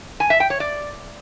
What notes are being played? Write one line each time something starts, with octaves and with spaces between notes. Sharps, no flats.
G#5
E5
G5
C#5
D5